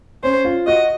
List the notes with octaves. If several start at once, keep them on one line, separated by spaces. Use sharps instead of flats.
C#4 C5
F4
F#4 D#5